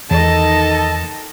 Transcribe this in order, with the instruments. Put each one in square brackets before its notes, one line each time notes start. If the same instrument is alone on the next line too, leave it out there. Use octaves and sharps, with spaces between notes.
[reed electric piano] E2 [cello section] D#3 A4 D#5 [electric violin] A5